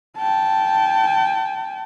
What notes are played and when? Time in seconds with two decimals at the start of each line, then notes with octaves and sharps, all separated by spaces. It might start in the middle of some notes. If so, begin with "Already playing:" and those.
0.18 G5 A5